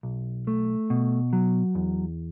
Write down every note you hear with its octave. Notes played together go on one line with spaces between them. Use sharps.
B1
A3
B2
F#3
E2